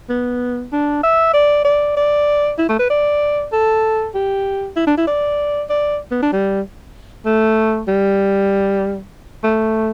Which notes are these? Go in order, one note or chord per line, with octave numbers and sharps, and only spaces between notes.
B3
D4
E5
D5
D5
D5
E4
A3
B4
D5
A4
G4
E4
D4
E4
D5
D5
B3
D4
G3
A3
G3
A3